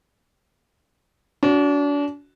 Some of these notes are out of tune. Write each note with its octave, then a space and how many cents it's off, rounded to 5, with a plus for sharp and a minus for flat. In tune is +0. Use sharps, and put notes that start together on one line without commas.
D4 -35 F#4 +0